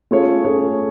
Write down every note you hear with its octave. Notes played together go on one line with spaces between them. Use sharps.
A3 C#4 F4 G#4 C#5
A3 C#4 F4 G#4 C#5